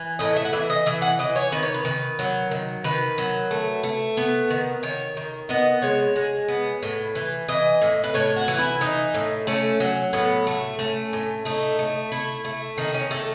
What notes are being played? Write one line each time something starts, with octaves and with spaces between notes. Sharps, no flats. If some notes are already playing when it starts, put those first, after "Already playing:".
Already playing: E3
A2 D#5
E5
F#5
E3 E5
D#5
E3 E5
F#5
E3 D#5
C#5
D#3 B4
C#5
B4
D#3
F#3
D#3
D#3 B4
F#3
A3
A3
B3
D#3
D#3 C#5
D#3
B3 D#5
G#3 C#5
G#3
B3
A2
E3
E3 D#5
A2
B4
A2 C#5
F#4
E3
E4
E3 D#4
A2
A3 C#4
F#3
A2 B3
A3
A3 C#4
A2
A3 D#4
A3
A3 E4
A3
D#3 D#4
C#4
A3 A4